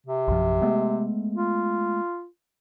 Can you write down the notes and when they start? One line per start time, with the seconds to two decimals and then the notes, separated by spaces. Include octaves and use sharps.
0.06 C3
0.28 A#1 F#2 F3
0.62 G#3 A3 B3
1.35 F4